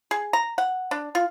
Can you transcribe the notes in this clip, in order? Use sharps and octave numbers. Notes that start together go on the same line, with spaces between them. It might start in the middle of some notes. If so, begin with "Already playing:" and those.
G#4
A#5
F#5
D4
F4